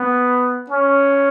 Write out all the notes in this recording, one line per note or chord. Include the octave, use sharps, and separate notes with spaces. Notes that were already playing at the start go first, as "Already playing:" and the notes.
Already playing: B3
C#4